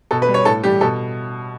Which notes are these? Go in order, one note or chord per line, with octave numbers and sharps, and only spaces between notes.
B2 A4
B4
G3
C#5
A2 A4
E3 G3 G4
B2 A4